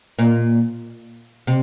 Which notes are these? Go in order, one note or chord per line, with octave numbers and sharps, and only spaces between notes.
A#2
C3